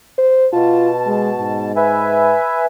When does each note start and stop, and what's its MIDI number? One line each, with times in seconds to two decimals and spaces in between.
0.18 0.47 72
0.53 1.72 47
0.53 0.90 65
0.53 1.72 81
1.06 1.30 56
1.39 2.36 44
1.77 2.66 71
1.77 2.66 76
1.77 2.66 80